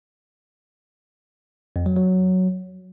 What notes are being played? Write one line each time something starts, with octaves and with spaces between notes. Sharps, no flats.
F2
F#3
F#3